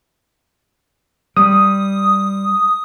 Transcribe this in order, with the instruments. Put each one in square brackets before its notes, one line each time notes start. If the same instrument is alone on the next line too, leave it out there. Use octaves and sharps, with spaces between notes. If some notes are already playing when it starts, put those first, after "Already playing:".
[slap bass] G3 [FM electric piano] D#6